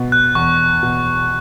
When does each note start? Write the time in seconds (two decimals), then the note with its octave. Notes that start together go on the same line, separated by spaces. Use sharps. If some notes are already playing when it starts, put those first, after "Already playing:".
Already playing: B2
0.12 F#6
0.35 E2 C#6
0.83 B2